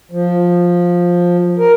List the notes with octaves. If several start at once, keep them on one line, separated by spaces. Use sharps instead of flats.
F3
A#4